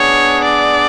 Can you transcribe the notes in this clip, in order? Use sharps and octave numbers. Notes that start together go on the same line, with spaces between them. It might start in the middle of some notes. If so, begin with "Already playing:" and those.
Already playing: B3 D4 G#4 C#5
D5